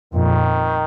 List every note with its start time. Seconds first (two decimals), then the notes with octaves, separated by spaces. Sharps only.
0.13 F2 A#2 D#3